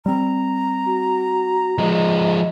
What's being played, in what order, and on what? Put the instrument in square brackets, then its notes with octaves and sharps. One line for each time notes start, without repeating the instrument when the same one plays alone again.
[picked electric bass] G3 C4 [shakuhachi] A#5
[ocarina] F#4
[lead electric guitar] F3 G#3 [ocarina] D#5